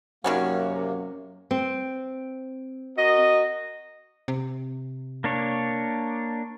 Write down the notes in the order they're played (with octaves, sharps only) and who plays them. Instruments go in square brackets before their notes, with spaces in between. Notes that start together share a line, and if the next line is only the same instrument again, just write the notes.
[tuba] F#2 [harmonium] C3 A#3 [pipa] D#3 G3 C#4 [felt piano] F#4 C#5
[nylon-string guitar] C4
[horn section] F#4 A#4 D#5
[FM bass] C3
[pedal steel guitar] A#3 D4 C#5